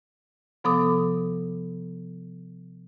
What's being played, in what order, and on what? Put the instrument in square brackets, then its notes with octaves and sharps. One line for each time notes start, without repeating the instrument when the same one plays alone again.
[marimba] C3 F3 B3 A4 D6 D#6